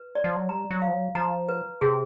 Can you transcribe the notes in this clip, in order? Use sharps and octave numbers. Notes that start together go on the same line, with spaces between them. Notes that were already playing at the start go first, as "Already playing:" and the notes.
Already playing: B4
D5
F3
F#3
G3 A#5
F#3
F5
F3
F#3
F3 A#5
B4
C3 G#4